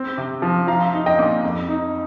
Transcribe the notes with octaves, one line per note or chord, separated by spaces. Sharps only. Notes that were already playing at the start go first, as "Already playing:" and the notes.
Already playing: C4
C3
F3
F3 F5 A#5
D#4
D#5 G5
A#2
F2
D#4